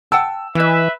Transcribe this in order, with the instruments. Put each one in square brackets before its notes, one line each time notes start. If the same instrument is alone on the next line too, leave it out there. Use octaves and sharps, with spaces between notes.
[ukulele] F#5 G5 A5 [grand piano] E6
[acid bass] E3 [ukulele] E4 D#5 [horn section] B4 E5